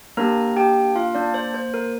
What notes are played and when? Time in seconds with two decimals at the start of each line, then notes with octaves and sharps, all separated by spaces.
0.17 A#3 D4 G4 A#4 A#5
0.57 G4 G5
0.96 F4 F5
1.15 D4 D5
1.34 C5
1.54 C5
1.74 A#4